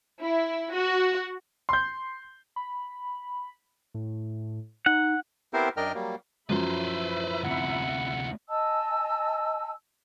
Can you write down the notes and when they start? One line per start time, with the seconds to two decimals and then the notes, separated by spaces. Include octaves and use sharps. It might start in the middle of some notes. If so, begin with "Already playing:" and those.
0.21 E4
0.74 F#4
1.69 C6 G6
2.56 B5
3.94 A2
4.86 D#4 F#5
5.53 B3 C4 E4 G4 A#4 C5
5.77 F#2 D4 A#4 D#5 G5 F6
5.94 F#3 G3 A#3
6.50 F#2 F3 E4 B4 C5 E5 B5
7.43 D2 C3 F#5
8.49 D#5 G#5 A5 E6